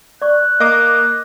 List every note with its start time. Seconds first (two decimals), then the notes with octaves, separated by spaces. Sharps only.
0.22 D5 C#6 F#6
0.60 A#3 D#5 D6